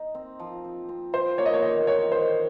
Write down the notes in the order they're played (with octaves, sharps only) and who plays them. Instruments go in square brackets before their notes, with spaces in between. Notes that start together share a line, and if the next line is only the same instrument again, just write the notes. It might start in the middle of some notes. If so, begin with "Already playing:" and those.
Already playing: [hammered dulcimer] D#4
C4
F3
C4
C4
[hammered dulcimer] F4 [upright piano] C5
[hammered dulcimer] A#3 [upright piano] C#5
[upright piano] D#5
C#5
[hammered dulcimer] D#3 [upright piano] D#5
[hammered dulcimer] D#3 [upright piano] C#5
[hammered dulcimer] D#3 [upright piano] C5